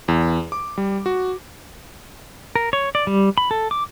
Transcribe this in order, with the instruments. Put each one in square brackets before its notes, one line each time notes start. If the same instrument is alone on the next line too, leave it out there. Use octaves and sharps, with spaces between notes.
[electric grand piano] E2
D6
G3
F#4
[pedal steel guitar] A#4
C#5
D5
G3
B5
A4
D6